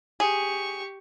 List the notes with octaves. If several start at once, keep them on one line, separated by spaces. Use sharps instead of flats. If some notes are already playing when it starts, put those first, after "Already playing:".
G4 G#4 C#6